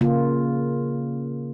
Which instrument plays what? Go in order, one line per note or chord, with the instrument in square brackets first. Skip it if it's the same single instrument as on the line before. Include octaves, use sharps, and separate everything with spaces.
[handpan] C#3 A#3 F4